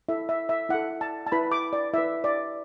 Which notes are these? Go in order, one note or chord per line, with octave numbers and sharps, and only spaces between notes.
E4 A4 E5
E5
E5
E4 A4 F#5
A5
A5
E4 B4 B5
D6
D5
E4 B4 E5
D5